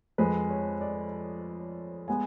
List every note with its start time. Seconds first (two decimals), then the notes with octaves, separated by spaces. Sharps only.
0.18 F2 F3 G#3 B4
0.50 C#5
0.81 D5
2.08 G#3 B3 G#5